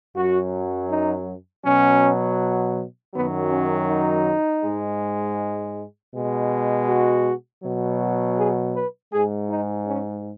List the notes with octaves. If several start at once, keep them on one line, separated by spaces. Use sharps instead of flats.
F#2 F#3 F#4
D#4
B2 F#3 C#4
F#2 D#3 F#3 B3
C#4
D#4
G#2 G#3
B2 G#3
F#4
B2 F#3
G#4
B4
G#2 G#3 G#4
D#4
C#4